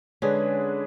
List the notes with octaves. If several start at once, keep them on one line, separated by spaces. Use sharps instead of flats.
D3 G#3 C#4 D4 G#4 B4